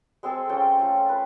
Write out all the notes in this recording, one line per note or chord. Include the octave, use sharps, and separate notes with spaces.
G#3 C4 G#4 A4
C#4 F4 A4 G5
A3 F4
B4